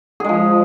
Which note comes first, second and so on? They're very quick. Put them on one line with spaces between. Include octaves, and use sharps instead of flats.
G#4 G#3 F3